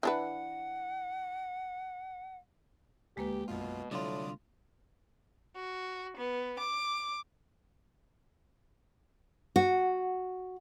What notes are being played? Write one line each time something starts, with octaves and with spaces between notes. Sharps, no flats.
E3 D4 B4 F#5
D2 G#3 A#3 G4 B4
B1 F#2 B2 F4
C2 A2 D3 F#3 F4 D5 D#6
F#4
B3
D6
F#4